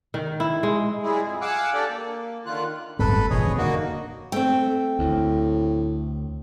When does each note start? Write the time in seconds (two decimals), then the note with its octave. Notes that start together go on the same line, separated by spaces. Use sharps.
0.14 D#3
0.40 E4
0.63 G#3
1.03 G3 G#3 E4 G#4
1.22 F2
1.41 F5 F#5 G#5 D6 E6 F#6
1.74 D4 G4 A4 D5
1.89 A#3
2.46 D3 D#3 F4 F#6
2.99 D1 G1 G3 A4 B4 B5
3.30 D#1 F3 G#4 C#5 D#5
3.43 F2 A#2
3.58 D3 A#3 D#4 F#4
4.32 A3 C4 G5
4.99 D2 A2